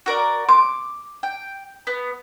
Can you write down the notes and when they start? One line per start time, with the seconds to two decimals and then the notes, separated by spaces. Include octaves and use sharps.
0.06 F#4 A#4 D5
0.49 C6 D6
1.23 G5
1.87 B3